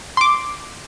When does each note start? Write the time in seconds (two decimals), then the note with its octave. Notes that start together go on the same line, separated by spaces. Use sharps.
0.17 C6 D6